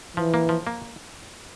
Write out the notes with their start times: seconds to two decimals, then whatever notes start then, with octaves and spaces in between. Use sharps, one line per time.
0.17 E3 F3
0.34 A#3
0.49 F3
0.67 A#3